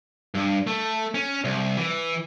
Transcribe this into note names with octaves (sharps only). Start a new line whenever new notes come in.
G2
A3
C#4
C2
E3